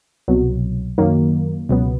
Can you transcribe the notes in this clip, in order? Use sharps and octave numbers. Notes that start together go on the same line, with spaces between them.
C2 B2 F#3
F#2 D#3 F#3 A#3
C#2 B2 F#3 B3